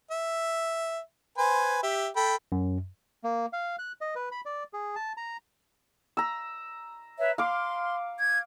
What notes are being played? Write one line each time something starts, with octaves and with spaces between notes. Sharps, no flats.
E5
B4 C5 G#5
G4 E5
A4 G5 B5
F#2
A#3
F5
F#6
D#5
B4
B5
D5
G#4
A5
A#5
A#5 E6
B4 C#5 E5
F5 C6 D6
G#6